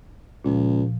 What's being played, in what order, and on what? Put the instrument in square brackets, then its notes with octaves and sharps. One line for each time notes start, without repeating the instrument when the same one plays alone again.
[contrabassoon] C#2 [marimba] A#2 F3